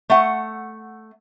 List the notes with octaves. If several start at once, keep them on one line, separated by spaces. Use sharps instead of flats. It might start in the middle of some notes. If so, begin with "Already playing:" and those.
A3 F#5